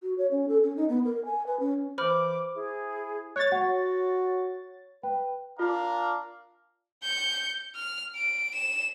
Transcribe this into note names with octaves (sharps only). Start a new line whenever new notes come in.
F#4
C#5
C#4
A4
C#4
D#4
B3
A#4
G#5
B4
C#4
E3 C5 B5 D6 F6
E4 G#4
C#5 F#6 A6
F#4 F#5
B4 G5
D4 F4 A#4 F5
G6 C#7
F6
D7
E7